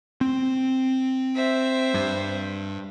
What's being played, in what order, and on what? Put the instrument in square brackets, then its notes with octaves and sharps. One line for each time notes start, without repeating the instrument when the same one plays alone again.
[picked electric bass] C4
[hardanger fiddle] C5 E5
[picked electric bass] G2